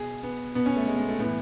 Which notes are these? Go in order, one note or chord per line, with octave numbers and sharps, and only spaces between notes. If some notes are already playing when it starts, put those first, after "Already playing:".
Already playing: B2 G#4
B3
B2 B3
C#4
A3
G#3
G#3
A3
A2 E3 B3